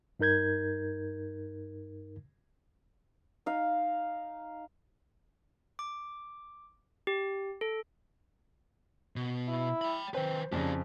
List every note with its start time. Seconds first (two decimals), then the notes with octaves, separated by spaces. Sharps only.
0.19 G2 D#4 A#4 G6 G#6
3.46 D#4 F5
5.79 D6
7.07 G4
7.61 A4
9.16 B2
9.48 E4
9.82 G5 B5
10.14 D#3 C4 B4 C5
10.52 F2 C#3 D4 D#4 G4